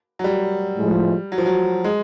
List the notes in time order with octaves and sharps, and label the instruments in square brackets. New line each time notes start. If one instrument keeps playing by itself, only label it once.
[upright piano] F#3
G3
[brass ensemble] A2 F3 G#3
[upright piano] F#3
F3
F#3
G#3